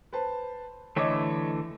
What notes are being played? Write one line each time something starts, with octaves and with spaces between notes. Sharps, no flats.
B4 C5 A5
D3 E3 A3 C#5 D#5 D6